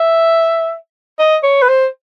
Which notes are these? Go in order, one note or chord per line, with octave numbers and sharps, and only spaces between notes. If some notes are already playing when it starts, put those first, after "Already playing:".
Already playing: E5
D#5
C#5
B4
C5